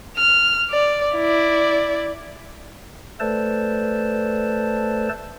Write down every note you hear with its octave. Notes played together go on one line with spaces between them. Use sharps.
F6
D5
E4 D5
A3 A4 B4 C5 D5 A5